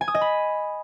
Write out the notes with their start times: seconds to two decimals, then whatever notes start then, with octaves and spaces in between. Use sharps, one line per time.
0.01 G#5
0.08 D#6
0.15 D#5
0.21 B5